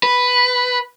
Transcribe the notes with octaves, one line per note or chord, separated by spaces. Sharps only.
B4